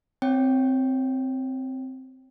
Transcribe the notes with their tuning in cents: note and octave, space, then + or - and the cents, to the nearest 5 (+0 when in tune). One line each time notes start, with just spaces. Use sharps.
C4 +0 C#5 +0 G5 +0